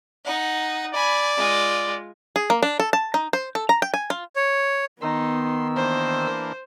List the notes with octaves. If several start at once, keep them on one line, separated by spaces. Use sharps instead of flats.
D#4 F#5
D5 G#5 B5
G#3 F4
G#4
A#3
D4
A4
A5
D#4
C5
A4
A#5
G5
G#5
F4
C#5
D#3 B3 D#4 C6 E6
E3 A#3 D4 C5